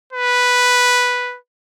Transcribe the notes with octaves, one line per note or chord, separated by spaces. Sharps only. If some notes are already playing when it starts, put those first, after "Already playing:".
B4